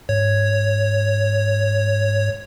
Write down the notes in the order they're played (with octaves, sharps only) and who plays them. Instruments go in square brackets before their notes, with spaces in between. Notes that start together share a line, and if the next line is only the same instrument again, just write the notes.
[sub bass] G#2 [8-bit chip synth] C#5